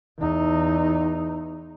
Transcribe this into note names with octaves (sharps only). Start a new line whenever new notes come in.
E2 D#4